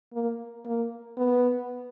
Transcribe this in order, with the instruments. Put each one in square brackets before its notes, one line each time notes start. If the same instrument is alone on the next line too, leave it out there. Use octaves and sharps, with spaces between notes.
[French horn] A#3
A#3
B3